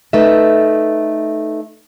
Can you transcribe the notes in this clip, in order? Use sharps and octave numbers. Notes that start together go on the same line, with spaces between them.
A3 D#4 B4 E5